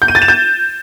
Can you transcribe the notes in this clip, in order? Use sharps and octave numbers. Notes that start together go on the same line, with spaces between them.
G6
D#7
A6
E7
G6